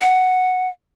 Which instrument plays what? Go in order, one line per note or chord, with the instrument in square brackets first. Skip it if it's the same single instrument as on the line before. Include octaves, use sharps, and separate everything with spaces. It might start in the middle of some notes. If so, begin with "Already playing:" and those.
[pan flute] F#5